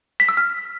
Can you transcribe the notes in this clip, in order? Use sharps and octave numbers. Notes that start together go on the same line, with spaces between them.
B6
E6
F6